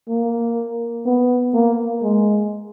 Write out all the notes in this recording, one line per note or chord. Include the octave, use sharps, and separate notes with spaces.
A#3
B3
A#3
G#3